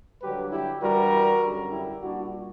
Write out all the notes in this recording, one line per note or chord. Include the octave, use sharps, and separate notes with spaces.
G2 D3 F#3 G4 B4
E4 G4
G2 E3 G3 F#4 A#4
F#2 D3 G3
E4 G4
A#2 G3 D4 F#4